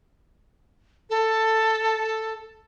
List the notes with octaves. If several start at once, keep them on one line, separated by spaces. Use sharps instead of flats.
A4